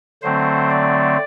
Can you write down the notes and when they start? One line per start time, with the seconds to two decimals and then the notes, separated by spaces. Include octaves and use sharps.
0.22 D3 F#3 A3 C4 C5
0.70 D5